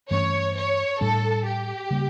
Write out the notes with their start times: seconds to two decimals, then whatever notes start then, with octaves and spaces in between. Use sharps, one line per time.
0.11 G2 E3 A3 C#4 C#5
0.56 C#5
1.01 A2 G3 D4 A4
1.45 G4
1.91 C#3 G3 A#3